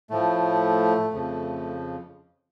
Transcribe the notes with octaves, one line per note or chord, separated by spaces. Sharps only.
A2 F3 A3
F2 C#3 F3